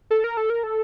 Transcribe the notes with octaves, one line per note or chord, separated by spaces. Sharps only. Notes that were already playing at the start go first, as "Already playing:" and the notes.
A4
A#4
A4
A#4
A4